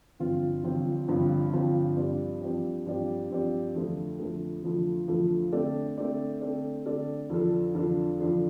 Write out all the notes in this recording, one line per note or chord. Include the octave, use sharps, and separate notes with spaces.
G1 G2 F3 C4 F4
G1 G2 F3 C4 F4
G1 G2 F3 C4 F4
G1 G2 F3 C4 F4
G2 F3 C4 G4 D5
G2 F3 C4 G4 D5
G2 F3 C4 G4 D5
G2 F3 C4 G4 D5
F2 D3 F3 A3
F2 D3 F3 A3
F2 D3 F3 A3
F2 D3 F3 A3
D3 A3 C4 A4 D5
D3 A3 C4 A4 D5
D3 A3 C4 A4 D5
D3 A3 C4 A4 D5
F2 D3 F3 D4 A4
F2 D3 F3 D4 A4
F2 D3 F3 D4 A4